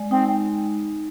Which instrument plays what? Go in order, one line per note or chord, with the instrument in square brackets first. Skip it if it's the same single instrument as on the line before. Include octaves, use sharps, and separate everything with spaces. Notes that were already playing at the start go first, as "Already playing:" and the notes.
Already playing: [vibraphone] G#3 D5
[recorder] C4 [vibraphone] D#4